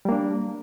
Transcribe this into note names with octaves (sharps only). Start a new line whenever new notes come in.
G3 A#3 D4